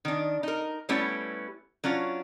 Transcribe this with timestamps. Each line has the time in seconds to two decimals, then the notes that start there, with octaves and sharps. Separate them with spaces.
0.05 D#3 D4
0.43 D#4 A#4
0.89 G3 A3 B3 C#4 E4 G4
1.84 F#3 C#4 D4 F4